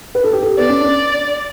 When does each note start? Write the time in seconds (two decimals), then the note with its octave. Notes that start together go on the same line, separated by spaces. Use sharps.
0.15 B4
0.24 A4
0.33 G4
0.42 A4
0.58 B3 D5
0.69 C#4
0.80 D4